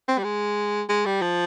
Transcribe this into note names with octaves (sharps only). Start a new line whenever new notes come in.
C4
G3
G#3
G#3
G3
F3